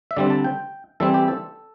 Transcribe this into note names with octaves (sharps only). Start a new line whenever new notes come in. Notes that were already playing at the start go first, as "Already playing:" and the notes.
E5
D3 G3 C4 D5
A5
G5
E3 G3 C4 A4
G4
A4